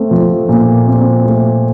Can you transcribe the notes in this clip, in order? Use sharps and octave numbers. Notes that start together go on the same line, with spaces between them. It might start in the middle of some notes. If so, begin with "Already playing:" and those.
Already playing: A3 C4
F3
A#2
C4
A3